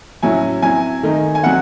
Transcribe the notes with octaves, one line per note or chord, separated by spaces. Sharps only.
A2 F#3 C#4 E4 G#5
F#3 C4 E4 G#5
D#3 A3 D#4
G#5
F#3 C4 F#5